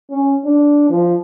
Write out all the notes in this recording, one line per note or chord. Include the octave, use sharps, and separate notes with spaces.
C#4
D4
F3